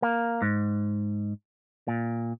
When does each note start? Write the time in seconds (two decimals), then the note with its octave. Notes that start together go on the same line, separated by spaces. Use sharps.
0.02 A#3
0.42 G#2
1.88 A#2